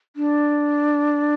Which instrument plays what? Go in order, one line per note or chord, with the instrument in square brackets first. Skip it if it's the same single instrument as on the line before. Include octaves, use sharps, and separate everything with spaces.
[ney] D4